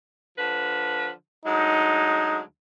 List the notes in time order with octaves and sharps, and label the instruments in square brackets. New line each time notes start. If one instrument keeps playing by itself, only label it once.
[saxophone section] D3 F3 B4
[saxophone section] D2 F#3 G#3 [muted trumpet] D#4